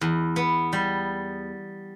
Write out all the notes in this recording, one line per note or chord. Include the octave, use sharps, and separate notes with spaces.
E2
B3
G3